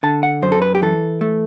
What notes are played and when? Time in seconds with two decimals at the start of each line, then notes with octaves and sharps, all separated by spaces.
0.03 D3 A5
0.23 F#5
0.42 F#2 C5
0.52 A4
0.62 B4
0.75 G4
0.82 E3 A4
1.21 A3